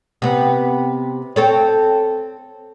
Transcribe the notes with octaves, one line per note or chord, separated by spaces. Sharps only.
C3 B3
C4 A4 C#5